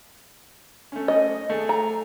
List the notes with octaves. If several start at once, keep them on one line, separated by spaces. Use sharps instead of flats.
A3 C#4
D#5
A3 G#4 A4
A#5